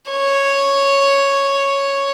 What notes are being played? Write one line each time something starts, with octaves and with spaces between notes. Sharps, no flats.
C#5